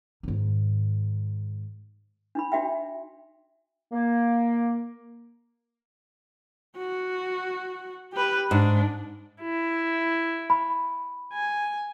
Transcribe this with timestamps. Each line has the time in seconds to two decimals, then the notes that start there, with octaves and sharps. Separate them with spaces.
0.23 G#2 D#3
2.35 D4 D#4 B5
2.52 D4 D#4 F#4 E5 G5
3.91 A#3
6.77 F#4
8.13 G4 B4
8.51 G#2 D4
9.42 E4
10.50 B5
11.33 G#5